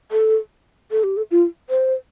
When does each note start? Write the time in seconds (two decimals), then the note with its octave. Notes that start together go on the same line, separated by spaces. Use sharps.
0.12 A4
0.91 A4
1.04 G4
1.17 A4
1.31 F4
1.70 C5